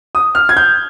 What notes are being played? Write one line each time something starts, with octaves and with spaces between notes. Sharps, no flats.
D#6
F6
G#6
G6